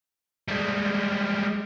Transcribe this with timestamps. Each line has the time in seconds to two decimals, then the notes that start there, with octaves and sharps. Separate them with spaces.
0.48 G3 G#3